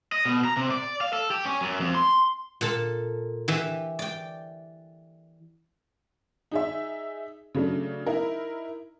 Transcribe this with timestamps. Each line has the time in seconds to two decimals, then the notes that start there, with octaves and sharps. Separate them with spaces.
0.12 D#5
0.25 B2
0.45 A#5
0.57 C3
0.71 D5
1.01 F5
1.13 A4
1.31 G4
1.45 C#4
1.61 F#2
1.80 F2
1.95 C6
2.61 A#2 A4 A5
3.48 E3 G4 E5
3.99 D5 G5
6.51 D#4 G#4 E5
7.55 C#3 F#3 A3 D4
8.06 D#4 E4 A#4